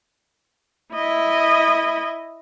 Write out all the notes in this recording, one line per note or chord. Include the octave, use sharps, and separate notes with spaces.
E4 D#5